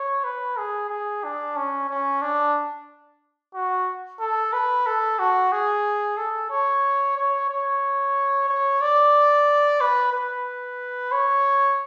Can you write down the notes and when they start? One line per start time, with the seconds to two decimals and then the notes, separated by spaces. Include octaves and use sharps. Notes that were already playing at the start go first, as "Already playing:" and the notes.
Already playing: C#5
0.24 B4
0.58 G#4
0.90 G#4
1.24 D4
1.56 C#4
1.90 C#4
2.22 D4
3.54 F#4
4.20 A4
4.53 B4
4.86 A4
5.19 F#4
5.52 G#4
6.18 A4
6.51 C#5
7.17 C#5
7.49 C#5
8.49 C#5
8.81 D5
9.81 B4
10.13 B4
11.12 C#5